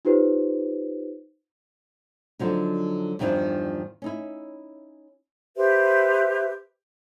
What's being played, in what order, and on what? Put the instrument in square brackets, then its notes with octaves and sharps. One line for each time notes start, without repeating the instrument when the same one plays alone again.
[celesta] D#4 F4 G4 B4 C5
[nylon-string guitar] D3 F3 F#3 D#4
E2 G2 D#3 F3 D4 E4
C#4 D#4 E4
[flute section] G4 B4 C5 E5